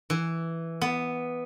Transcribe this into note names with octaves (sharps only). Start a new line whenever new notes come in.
E3
B3